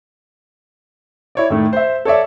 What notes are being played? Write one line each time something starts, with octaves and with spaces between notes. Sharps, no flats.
E4 C#5 D5
A2 D#3 A3
C5 E5
A4 C#5 D5 E5